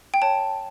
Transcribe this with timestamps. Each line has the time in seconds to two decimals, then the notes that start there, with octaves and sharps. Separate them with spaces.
0.14 G5
0.22 C#5 A5